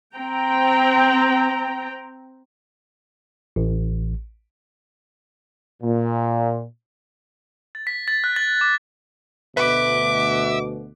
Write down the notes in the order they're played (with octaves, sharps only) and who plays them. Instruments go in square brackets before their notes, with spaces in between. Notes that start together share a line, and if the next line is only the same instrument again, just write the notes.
[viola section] C4 G5 A#5
[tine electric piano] A1
[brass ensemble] A#2
[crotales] A6
B6
A6
F#6
A6
D6
[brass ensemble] D2 B2 [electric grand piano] B4 [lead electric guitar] E5 [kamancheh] D6